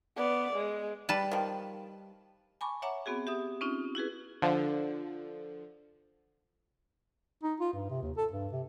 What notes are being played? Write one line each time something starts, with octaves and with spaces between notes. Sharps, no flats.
B3 D5
G#3
G3 B4 A5
D#3 F3
G#5 A5 B5 C#6 D6
C#5 E5 F#5 A#5 D6
B3 C4 F#4 G#4
G4 E5 D#6
C4 C#4 D#4 F4
E4 F#4 G#4 B4
D3 F3
D#4
F4
G2
C3
D#2
A4
G2
C3